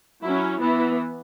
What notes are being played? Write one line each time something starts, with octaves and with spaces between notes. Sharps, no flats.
F#3 C#4 E4
E3 B3 E4